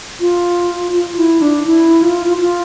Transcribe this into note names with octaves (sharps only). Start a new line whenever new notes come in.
F4
F4
E4
D4
E4
F4
F4